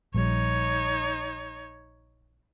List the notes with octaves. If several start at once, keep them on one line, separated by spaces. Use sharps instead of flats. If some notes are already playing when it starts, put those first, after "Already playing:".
A#1 G3 D#4 C#5